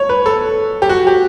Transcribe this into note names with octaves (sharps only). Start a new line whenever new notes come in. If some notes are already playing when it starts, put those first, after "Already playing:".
Already playing: C#5
B4
A4
G4
F#4
G4